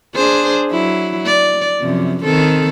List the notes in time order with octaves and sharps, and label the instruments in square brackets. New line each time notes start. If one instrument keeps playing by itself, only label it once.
[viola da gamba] D4 G#4 C5
F#3 E4
D5
F#2 C3 F3
D#3 C4 A4